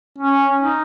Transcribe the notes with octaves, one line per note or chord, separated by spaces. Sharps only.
C#4
D#4